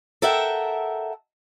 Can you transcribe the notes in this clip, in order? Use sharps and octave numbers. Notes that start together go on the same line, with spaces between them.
A4 A#4 E5 F#5 G5